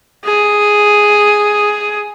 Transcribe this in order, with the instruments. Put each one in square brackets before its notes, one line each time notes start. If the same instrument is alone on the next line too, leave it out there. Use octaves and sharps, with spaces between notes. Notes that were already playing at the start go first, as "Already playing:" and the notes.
[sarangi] G#4